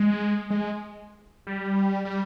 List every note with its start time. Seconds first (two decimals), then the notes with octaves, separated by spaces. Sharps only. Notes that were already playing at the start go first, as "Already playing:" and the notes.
Already playing: G#3
0.51 G#3
1.47 G3
2.05 G3